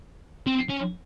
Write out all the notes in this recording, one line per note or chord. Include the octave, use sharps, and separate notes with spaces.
C4
C#4